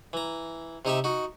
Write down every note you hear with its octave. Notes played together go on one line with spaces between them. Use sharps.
E3 A#5
C3 D#4 G4 E5
D#4 F#4